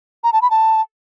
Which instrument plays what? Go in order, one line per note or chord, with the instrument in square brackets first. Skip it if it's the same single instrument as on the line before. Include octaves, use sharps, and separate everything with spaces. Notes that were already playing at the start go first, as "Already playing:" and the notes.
[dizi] A#5
A5
B5
A5